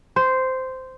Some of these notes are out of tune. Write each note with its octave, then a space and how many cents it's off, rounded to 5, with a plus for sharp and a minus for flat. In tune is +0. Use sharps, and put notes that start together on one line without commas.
C5 -10